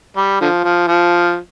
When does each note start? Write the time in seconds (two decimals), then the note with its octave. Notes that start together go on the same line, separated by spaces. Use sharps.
0.17 G3
0.41 D3 F3
0.64 F3
0.88 F3